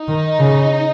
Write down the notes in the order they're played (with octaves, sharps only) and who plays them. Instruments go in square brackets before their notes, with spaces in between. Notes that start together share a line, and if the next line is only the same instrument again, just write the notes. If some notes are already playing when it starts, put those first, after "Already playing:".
Already playing: [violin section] D#4
[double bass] D#3
C#3